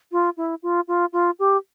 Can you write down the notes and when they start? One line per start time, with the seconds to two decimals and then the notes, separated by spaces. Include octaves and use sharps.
0.12 F4
0.37 E4
0.63 F4
0.88 F4
1.13 F4
1.39 G4